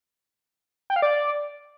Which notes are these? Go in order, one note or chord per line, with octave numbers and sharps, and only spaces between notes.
G5
F5
D5